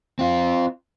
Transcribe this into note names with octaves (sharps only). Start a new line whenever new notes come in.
C4 F4